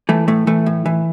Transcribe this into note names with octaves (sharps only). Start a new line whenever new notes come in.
E3 A3
A2 A3
E3 A3
A2
E3